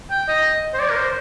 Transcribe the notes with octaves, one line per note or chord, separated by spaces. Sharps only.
G5
D#5
C5
D5
A#4
C5